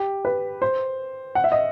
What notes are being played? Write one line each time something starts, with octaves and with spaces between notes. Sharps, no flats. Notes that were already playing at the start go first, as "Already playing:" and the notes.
Already playing: G4
B4
C5
F#5
E5
D#5